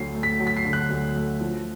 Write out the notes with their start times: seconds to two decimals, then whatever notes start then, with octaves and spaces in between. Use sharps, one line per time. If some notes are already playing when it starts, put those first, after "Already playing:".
Already playing: D2 D3 F#3 C7
0.15 A3
0.23 B6
0.40 F#3
0.47 B6
0.57 C7
0.65 D3
0.73 F#6
0.90 D2
1.16 A3
1.41 F3